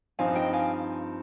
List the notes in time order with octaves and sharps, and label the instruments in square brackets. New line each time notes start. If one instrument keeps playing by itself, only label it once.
[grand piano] G2 F3 C4 D#4 [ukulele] F5 G#5
[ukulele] D#5 G5
F5 G#5